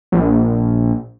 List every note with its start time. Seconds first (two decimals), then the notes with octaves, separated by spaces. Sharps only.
0.12 A#1